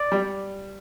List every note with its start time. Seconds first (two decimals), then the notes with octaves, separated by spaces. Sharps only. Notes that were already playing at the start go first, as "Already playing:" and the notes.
Already playing: D5
0.12 G3